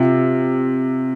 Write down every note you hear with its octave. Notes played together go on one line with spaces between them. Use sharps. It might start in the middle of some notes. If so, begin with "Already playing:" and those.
Already playing: C3 F4